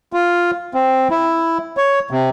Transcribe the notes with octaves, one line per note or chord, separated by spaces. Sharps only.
F4
C4
E4
C#5
C3